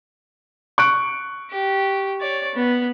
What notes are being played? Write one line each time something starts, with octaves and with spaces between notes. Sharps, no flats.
C#6 F#6 D7
G4
C#5 D5
B3